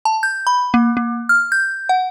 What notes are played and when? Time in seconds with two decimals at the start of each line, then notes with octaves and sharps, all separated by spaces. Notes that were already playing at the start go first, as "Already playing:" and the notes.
0.05 A5
0.23 G6
0.47 B5
0.74 A#3
0.97 A#3
1.29 F6
1.52 G6
1.89 F#5